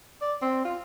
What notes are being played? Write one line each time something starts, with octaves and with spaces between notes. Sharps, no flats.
D5
C4
F4